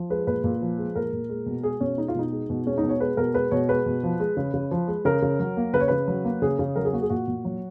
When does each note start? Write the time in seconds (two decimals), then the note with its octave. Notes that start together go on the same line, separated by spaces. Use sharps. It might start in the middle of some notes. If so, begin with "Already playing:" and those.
Already playing: F3
0.10 G#3 B4
0.27 A#2 B4
0.44 A#2
0.62 F3
0.78 G#3
0.96 A#2 A#4
1.13 A#2
1.30 G#3
1.46 B2
1.63 G#3 G#4
1.80 B2 C#4
1.98 G#3 D#4
2.08 F4
2.15 B2 D#4
2.32 G#3
2.50 B2
2.66 G#3 C#4
2.78 D#4
2.83 B2
2.89 C#5
3.00 G#3 B4
3.17 B2 A#4
3.34 G#3 B4
3.51 B2 C#5
3.69 G#3 B4
3.86 B2
4.03 F3
4.20 G#3
4.37 C#3
4.54 C#3
4.71 F3
4.88 G#3
5.05 C#3 A#4
5.22 C#3
5.40 F#3
5.57 A#3
5.73 C#3 B4
5.80 C#5
5.88 C#3 B4
6.08 F#3
6.25 A#3
6.42 C#3 G#4
6.59 C#3
6.76 F#3 A#4
6.85 G#4
6.93 A#3 F#4
7.02 G#4
7.10 A#2 F#4
7.28 A#2
7.45 F#3